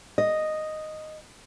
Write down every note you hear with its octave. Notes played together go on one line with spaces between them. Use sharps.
D#5